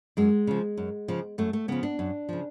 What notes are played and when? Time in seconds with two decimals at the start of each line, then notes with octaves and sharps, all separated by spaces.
0.17 F#2 G#3
0.47 C#3 F3
0.77 F#2
1.08 C#3 F3
1.38 F#2 A3
1.53 A3
1.68 C#3 F3 B3
1.83 D4
1.99 F#2
2.29 C#3 F3